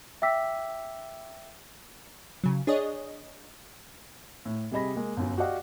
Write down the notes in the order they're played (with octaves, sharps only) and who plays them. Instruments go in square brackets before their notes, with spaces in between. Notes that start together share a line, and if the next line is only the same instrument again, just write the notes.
[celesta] E5 G5 D6 E6 B6
[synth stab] C#3 F#3
D4 G#4 C#5 D#5
[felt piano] A2
C3 G3 G#4 D#5 B5 A#6
G#3 A#3
G1 F#2
F#4 G4 D5 D#5 F5 F#5